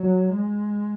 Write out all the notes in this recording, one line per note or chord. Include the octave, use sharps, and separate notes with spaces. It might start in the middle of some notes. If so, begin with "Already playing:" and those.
Already playing: F#3
G#3